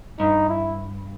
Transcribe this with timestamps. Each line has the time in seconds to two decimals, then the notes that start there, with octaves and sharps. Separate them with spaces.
0.19 G2 D#4
0.49 E4